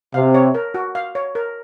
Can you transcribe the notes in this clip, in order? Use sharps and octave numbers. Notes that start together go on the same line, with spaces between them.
C3 F5
C#5
A#4
F#4
F5
C#5
A#4